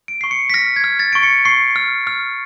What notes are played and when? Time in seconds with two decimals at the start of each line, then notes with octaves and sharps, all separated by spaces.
0.08 D7
0.21 C#6 C7
0.31 C#7
0.50 B6
0.54 F6 A#6
0.76 G#6
0.84 F6
0.99 A6
1.13 C#6 D7
1.23 C#7
1.45 C#6 C7
1.76 F6
2.07 F6